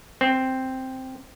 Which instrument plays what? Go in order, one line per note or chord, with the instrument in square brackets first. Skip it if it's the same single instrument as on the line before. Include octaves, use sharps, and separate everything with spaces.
[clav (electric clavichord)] C4